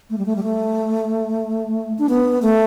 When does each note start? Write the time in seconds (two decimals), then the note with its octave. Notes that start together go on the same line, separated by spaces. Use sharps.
0.10 A3
0.18 G3
0.26 A3
0.36 G3
0.43 A3
1.99 D4
2.09 B3
2.42 A3